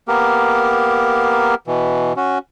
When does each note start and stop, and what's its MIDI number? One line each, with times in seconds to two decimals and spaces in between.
0.08 1.55 58
0.08 1.55 59
0.08 1.55 67
0.08 1.55 70
1.67 2.13 47
1.67 2.13 52
2.17 2.38 61
2.17 2.38 66